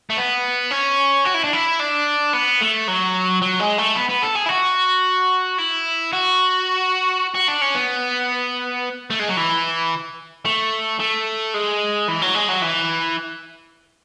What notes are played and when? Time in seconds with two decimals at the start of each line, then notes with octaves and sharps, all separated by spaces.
0.10 A3
0.17 B3
0.71 C#4
1.25 F#4
1.34 E4
1.44 D4
1.53 E4
1.80 D4
2.33 B3
2.61 A3
2.88 F#3
3.42 F#3
3.60 G#3
3.78 A3
3.96 B3
4.09 B3
4.23 A4
4.36 G#4
4.46 E4
4.50 F#4
5.58 E4
6.13 F#4
7.34 F#4
7.48 D4
7.61 C#4
7.75 B3
9.10 A3
9.19 G#3
9.28 F#3
9.37 E3
10.45 A3
11.00 A3
11.54 G#3
12.08 E3
12.22 F#3
12.35 G#3
12.48 F#3
12.62 E3